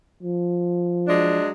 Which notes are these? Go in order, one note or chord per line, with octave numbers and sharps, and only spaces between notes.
F3
F#3 G#3 D4